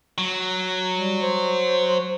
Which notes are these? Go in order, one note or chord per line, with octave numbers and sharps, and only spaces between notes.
F#3
G3
C5